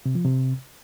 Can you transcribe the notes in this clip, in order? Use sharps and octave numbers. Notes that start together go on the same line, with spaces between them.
C3
F3
C3